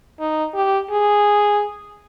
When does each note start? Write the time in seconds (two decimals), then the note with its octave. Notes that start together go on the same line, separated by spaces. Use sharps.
0.20 D#4
0.55 G4
0.90 G#4